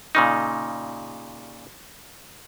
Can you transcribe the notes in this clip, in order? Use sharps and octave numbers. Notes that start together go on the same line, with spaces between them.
A#2 C#3 D#4